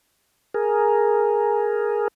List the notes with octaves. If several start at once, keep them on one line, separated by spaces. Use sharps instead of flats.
G#4 A#4